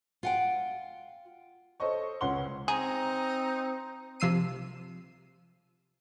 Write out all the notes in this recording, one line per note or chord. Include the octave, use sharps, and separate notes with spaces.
F4 F#5 G5
A4 C5 C#5 D#5 C#6
C#2 B4 C#5 F#5 C6 G7
C4 D#4 G#4 A#5
C3 F3 E6 C7 D#7